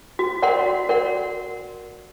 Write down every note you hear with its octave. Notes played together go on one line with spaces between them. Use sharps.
F#4
A#4 D5 F#5 C6
F#4
A#4 D5 F#5 C6